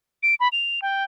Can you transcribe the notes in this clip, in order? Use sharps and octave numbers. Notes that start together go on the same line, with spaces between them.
D7
B5
F7
G5